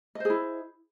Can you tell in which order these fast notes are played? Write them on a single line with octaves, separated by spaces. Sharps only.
D#5 C5 G#4 E4